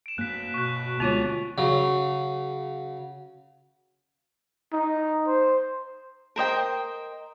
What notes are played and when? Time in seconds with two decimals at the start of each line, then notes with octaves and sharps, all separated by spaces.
0.06 D7 E7
0.18 G2 A#3 F#6 B6
0.54 B2 C#6 F#6
1.00 D2 G#3 B3 F4 C#5 F7
1.58 C#3 F#3
4.73 D#4
5.27 C5
6.36 A#4 C5 D#5 G5